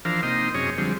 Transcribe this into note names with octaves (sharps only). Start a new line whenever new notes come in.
E3 F3 D4 A#4 C5 F5
C3 A#3 D#4 D#5 G5 C6
F#2 C3 C#4 G#4 C#5 D#5
D3 F3 G3 G#3 C4